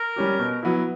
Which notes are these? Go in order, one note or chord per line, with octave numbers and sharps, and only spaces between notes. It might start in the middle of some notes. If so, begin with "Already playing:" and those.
Already playing: A#4
G3 C#4 G4
B2
F#3 B3 E4